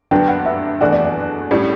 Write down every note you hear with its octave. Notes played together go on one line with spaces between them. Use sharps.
G2 D3 F#3 B3 D4 G5
F#5
E5
E2 B2 A3 D4 F#4 D5
D5
D5
A2 G3 C#4 D5